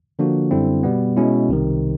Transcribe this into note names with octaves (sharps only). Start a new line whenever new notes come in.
D3 F3 A#3 D4 F#4
F#2 D3 G3 C4 E4
B2 G3 B3
B2 G#3 C#4 E4
C2 C3 D#3